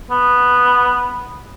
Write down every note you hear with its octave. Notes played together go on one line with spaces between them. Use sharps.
B3